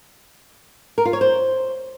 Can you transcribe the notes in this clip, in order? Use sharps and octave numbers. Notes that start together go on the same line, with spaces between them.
A#4
F4
C#5
C5